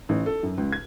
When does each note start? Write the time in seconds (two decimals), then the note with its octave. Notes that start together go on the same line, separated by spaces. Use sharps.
0.09 A1
0.26 A4
0.43 F#2
0.58 C#2
0.72 G#6